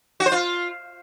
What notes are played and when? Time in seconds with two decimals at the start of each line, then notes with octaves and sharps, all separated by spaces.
0.20 F#4
0.26 C5
0.32 F4